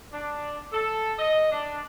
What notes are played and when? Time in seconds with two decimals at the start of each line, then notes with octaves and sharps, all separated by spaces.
0.12 D4
0.72 A4
1.18 D#5
1.51 D4